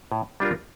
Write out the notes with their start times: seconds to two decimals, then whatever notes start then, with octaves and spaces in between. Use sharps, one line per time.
0.12 A2
0.40 G3 D4 F4 A#4